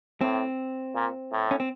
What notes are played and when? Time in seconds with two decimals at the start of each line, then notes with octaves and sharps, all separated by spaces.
0.21 A2 C4
0.95 A#2
1.32 A2
1.51 C#4
1.60 C4